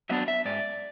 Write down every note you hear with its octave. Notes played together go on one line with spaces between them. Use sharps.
F#3 B3 D4 E5
E5
G#2 D5